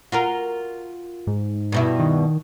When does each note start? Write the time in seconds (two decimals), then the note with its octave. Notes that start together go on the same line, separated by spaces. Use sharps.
0.12 F4 F#4 A#4
1.27 G#2
1.72 G2 B2 E4
1.99 D#3